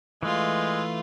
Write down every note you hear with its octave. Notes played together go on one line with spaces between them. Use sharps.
E3 G#3 A3 F4 B4